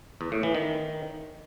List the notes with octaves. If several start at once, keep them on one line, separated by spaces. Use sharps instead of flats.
E2
A2
E3
D#3